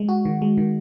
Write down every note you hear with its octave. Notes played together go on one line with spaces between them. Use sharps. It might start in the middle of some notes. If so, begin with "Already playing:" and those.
Already playing: G#3
F#4
D#3
G#3
D#3